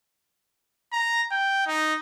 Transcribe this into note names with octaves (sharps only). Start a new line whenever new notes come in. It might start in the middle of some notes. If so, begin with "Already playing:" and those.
A#5
G5
D#4